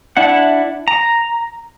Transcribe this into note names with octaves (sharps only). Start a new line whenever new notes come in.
D4 E4 F#5
A#5